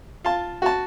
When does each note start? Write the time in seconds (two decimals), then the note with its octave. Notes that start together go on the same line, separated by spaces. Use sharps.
0.24 F4 A5
0.62 F#4 A5